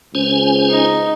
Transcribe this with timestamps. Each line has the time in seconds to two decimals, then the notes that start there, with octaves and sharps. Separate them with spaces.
0.15 C#2 C#4 C5 G#5
0.70 D#4